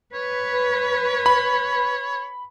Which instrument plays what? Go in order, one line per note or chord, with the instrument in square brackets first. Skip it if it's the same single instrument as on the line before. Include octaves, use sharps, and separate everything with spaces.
[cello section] B4 [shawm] C#5
[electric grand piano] B5